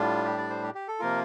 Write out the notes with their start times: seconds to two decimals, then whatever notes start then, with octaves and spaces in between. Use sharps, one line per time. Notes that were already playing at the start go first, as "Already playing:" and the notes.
Already playing: A2 G3 D4 F4
0.24 G4
0.38 D5
0.50 C5
0.63 G4
0.75 G4
0.88 A4
0.99 C3 F3 A#3 F4 A#4